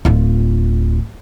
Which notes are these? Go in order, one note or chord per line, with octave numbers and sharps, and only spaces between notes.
D1 F4